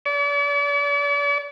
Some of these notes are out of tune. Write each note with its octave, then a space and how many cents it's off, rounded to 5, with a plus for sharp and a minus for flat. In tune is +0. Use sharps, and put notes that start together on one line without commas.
D5 -45